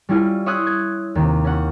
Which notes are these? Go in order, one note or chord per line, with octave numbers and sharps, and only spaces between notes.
G3 C#4 E4 F4
C#5 E5 C6 D#6 F#6 G#6
G#6
D#2 C3
C#4 F#5